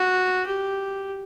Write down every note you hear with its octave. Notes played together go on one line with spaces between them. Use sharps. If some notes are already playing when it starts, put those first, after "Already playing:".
Already playing: F#4
G4